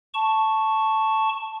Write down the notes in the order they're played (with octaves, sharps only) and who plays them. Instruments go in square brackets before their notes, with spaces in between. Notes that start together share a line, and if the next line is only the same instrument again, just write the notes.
[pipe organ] A5 C#6